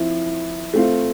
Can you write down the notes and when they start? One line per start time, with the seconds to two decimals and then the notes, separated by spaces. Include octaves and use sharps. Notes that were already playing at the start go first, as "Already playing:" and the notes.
Already playing: F3 C4 E4
0.74 A3 C4 F4